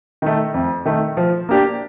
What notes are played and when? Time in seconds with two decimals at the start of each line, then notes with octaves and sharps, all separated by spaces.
0.22 D#3 A3
0.54 F2
0.86 D#3 A3
1.17 F3
1.49 A#3 D4 G4